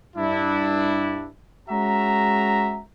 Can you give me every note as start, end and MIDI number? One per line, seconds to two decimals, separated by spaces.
0.16 1.28 43
0.16 1.28 62
0.16 1.28 64
1.69 2.80 56
1.69 2.80 61
1.69 2.80 66
1.69 2.80 76
1.69 2.80 82